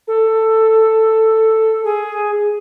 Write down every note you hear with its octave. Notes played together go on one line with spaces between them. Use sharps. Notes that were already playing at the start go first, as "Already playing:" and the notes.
A4
G#4